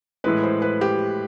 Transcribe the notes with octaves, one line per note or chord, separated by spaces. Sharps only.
A2 E3 G#3 B4
C5
B4
G4